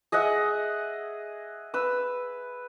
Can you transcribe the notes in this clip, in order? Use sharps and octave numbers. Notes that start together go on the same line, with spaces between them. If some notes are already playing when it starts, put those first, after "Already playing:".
G#4 D#5 E5 F#5
B4 E6